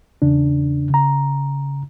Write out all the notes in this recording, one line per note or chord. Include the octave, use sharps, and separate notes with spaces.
E2 C#3 D4
C#3 A#5